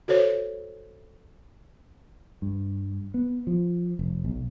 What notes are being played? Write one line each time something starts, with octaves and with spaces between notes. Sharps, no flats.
F#4 A4 C5 C#5
G2
B3
F3
F1
B1